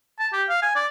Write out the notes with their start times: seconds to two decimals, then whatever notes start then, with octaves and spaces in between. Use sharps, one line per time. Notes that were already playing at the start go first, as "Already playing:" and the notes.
0.19 A5
0.32 G4
0.49 F5
0.62 G#5
0.75 D5